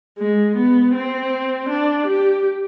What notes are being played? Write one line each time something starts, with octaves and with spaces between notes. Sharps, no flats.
G#3
B3
C4
D4
G4